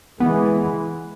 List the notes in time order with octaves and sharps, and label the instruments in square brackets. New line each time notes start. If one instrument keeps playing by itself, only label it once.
[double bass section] E3 G#3 [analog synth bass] B3